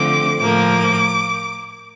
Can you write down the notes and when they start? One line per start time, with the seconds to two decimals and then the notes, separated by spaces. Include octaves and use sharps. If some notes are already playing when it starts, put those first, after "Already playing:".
Already playing: D3 F3 A3 C4 D6
0.39 A2 F3 A#3 D6